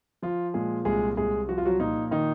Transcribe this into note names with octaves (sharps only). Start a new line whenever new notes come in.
F3 F4
A#2 G#3 G#4
C2 G#3 G#4
C2 G#3 G#4
F3 F#4
F4
F#3 F#4
A#2 D#4
D#3 D#4